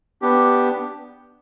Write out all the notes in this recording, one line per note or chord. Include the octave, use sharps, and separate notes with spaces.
B3 D4 G4